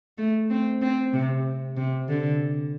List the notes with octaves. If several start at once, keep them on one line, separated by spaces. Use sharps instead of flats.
A3
C4
C4
C3
C3
D3